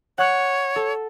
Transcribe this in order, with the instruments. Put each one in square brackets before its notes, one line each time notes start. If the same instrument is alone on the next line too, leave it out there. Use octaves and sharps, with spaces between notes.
[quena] C#5 [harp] F#5 F#6
[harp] A4